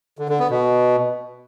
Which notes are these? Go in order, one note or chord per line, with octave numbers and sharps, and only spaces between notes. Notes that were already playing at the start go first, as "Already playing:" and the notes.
D3
D3
B3
B2